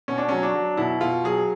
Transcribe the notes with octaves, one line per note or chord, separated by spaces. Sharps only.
B2 C#4
D4
F#3 C#4
D4
F#3
B2 E4
B2 F4
F#3 G#4